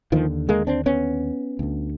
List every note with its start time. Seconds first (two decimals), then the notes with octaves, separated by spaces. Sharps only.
0.12 D#2 D3 D#3 F3
0.49 G#3 A#3
0.67 C4 D4
0.86 B3 C#4
1.59 D2 D3